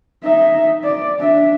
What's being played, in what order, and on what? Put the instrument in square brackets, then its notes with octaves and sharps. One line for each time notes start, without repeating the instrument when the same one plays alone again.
[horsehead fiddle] D#4 E5
D5
D4 E5